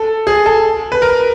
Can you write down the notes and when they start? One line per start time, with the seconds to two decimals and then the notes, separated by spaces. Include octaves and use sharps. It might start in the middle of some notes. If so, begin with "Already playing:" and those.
Already playing: A4
0.27 G#4
0.46 A4
0.92 B4
1.02 A#4